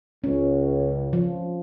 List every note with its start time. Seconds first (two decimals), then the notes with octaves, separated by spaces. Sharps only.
0.24 C#2 C#4
1.13 F3